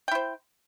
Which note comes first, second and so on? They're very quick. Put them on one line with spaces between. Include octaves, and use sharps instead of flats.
G5 E4 C5